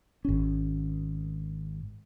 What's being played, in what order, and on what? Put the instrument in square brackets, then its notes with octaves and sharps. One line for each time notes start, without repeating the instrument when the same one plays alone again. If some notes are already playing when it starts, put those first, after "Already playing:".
[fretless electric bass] G#1 C#4